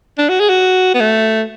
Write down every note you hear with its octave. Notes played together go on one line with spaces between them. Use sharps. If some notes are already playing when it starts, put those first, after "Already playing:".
D4
F#4
G#4
F#4
B3
A3